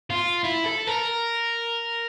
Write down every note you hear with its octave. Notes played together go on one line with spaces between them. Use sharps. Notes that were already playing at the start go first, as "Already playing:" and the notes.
F4
E4
A4
A#4